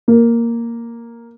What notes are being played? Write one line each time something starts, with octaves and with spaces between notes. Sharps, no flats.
A#3